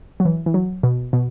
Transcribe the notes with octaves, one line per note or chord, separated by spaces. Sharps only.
F#3
E3
E3
F#3
B2
B2